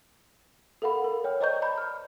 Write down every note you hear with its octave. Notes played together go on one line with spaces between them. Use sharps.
A4 A#4 F5 F#5 B5
A#4
C#5 G5 F6
C5 D5 D#5 A#5 C#6 G6
A#5 B5 G6
F6